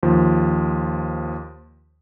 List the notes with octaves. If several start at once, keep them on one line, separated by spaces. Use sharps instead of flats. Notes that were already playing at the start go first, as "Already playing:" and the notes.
D#2 F3